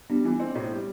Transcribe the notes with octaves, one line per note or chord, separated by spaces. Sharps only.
G3 B3 D4
E3
C4
A2
G3